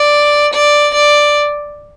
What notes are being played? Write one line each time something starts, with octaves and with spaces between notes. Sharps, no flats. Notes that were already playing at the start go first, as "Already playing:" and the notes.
Already playing: D5
D5
D5